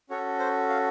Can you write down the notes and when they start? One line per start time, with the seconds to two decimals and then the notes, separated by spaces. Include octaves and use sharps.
0.09 C#4 F#4 A4 C#5
0.39 C5
0.69 F5